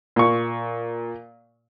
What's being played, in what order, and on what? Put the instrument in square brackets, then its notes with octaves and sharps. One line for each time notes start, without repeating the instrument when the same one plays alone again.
[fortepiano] A#2 C#6